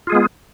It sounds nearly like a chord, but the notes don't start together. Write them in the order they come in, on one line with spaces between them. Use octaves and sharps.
F4 G#4 G#3 B3